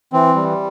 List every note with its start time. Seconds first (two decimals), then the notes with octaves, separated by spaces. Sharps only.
0.13 E3 C4
0.35 G3